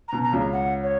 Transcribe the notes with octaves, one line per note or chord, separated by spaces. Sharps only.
B2 A#5
A#5
C#2 C#3
F#5
C#5